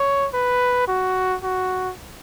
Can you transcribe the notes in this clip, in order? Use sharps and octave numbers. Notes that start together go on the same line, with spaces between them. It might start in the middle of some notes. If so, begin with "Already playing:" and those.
Already playing: C#5
B4
F#4
F#4